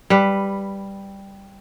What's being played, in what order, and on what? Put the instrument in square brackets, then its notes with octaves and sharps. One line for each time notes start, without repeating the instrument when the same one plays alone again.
[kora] G3 B4